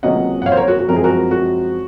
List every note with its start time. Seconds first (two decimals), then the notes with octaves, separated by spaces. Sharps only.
0.03 C#2 C3 F#3 A#3 C#4 D#5 F#5
0.42 F#5
0.46 C#5 F5
0.52 C5
0.57 A#4 C#5
0.68 F#4
0.79 F#4
0.88 F#2 F3 G#3 C4 A#4
0.96 G#4
1.04 F#4 A#4
1.31 F#4